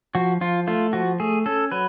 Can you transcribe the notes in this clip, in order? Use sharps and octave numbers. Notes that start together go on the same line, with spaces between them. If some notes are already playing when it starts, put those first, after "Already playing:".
F3 F#4
F3 F4
A3 F4
F3 F#4
A3 G#4
C#4 A4
F#3 B4